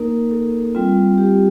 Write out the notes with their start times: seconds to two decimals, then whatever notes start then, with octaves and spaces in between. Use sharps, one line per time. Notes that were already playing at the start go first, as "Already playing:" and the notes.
Already playing: A#3 D#4 A#4
0.31 A4
0.75 G3 C4 F4
1.18 G4